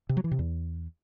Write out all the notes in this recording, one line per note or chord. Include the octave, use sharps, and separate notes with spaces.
C3
F#3
E3
C3
E2